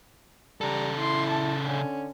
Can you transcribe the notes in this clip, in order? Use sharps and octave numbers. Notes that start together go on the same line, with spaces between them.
C#3 G3 A4 A#5
E4 C6
A5
D3 C#4